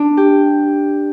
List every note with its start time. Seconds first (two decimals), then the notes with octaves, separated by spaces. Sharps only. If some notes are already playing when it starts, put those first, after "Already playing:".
Already playing: D4
0.17 G4